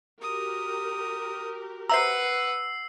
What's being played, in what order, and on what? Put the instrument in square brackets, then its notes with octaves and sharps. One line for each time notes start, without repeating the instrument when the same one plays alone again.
[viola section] F#4 G4 A#4 [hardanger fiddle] D#6
[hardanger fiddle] B4 F#5 [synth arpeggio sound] C5 E5 A#5 [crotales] E6 C7